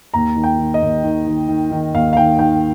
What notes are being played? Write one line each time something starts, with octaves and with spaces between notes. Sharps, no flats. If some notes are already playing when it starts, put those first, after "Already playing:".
D#2 A#5
D#3
G5
D#3
D#5
D#2
D#3
D#3
D#3
D#3
D#2 F5
F5
D#3 G5
D#3 G5